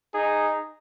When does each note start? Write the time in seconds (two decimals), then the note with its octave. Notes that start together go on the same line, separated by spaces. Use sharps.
0.14 D#4 G#4